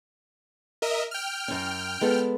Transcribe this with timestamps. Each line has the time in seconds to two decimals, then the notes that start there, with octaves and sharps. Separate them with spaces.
0.82 A#4 D#5 E5
1.11 G5 F6
1.48 F#2 C#4
2.01 G#3 B3 A4